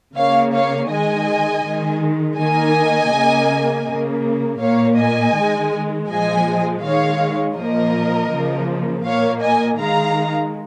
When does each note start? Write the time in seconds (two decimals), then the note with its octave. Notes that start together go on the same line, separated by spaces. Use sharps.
0.16 C#3 A#3 C#5 F5
0.53 C#5 F5
0.90 D#3 G#3 D#5 G#5
1.64 D#3 G#3
2.38 D#3 A#3 D#5 G#5
3.13 C#3 A#3
3.86 C#3 A#3
4.61 A#2 A#3 C#5 F5
4.98 D#5 G#5
5.35 D#3 G#3
6.09 A#2 F3 G#3 D#5 G#5
6.83 D#3 G#3 C#5 F5
7.57 A#2 F3 A#3 A#4 D#5
8.31 C#3 F3 A#3
9.05 A#2 A#3 C#5 F5
9.42 D#5 G#5
9.79 D#3 G#3 F5 A#5